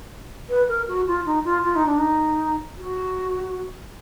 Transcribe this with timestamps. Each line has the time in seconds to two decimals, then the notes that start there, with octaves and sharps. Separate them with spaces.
0.49 B4
0.68 A#4
0.88 F#4
1.07 F4
1.26 D#4
1.44 F4
1.64 F4
1.75 D#4
1.86 D4
1.98 D#4
2.78 F#4